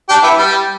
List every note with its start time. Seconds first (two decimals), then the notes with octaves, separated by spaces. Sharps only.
0.09 D4 G4
0.23 B3 E4
0.38 G3